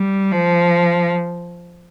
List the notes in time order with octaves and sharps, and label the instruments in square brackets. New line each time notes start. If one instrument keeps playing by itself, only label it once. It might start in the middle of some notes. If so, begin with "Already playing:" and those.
Already playing: [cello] G3
F3